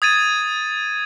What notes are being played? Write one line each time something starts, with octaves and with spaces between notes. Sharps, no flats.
D#6 G#6 A6 D#7